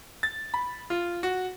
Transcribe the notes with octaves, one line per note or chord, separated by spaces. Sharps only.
A6
B5
F4
F#4